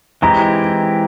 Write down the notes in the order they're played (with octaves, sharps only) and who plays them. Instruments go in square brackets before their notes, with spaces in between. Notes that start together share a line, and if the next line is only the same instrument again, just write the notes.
[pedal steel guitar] E3 G#3 C4 E4 G4 [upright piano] A#5